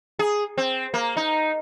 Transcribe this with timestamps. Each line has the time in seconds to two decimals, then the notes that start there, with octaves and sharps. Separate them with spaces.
0.19 G#4
0.58 C4
0.94 A#3
1.17 D#4